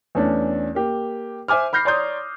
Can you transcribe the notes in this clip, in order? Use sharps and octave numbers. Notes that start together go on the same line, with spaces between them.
E2 A3 C#4 D4
A#3 G4
C5 E5 G#5 D6 F6
B5 F6 G6 A#6 C7
C#5 D5 A#5 C6 D#6 G6